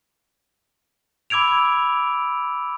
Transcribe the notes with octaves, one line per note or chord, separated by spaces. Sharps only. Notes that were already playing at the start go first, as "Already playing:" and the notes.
B5 D6 E6 G#6 D7 F7